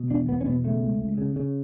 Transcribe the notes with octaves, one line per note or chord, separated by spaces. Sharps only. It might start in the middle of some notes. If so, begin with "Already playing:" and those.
Already playing: B2
E2 D4
E2 B3
C#4
B2 B3
C#3 A3
C#2
C#2
C#3
C#3